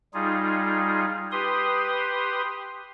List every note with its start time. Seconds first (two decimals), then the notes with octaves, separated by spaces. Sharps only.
0.14 G3 D#4 F4 G#4
1.32 G4 B4 C6 D#6